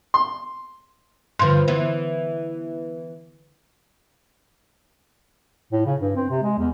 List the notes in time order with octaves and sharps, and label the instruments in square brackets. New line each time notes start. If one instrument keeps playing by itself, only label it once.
[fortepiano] C6
[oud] G2 F3 [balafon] D3 C6
[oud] E3 B3
[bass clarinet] A2
C#3
G2
C4
C3
G#3
E2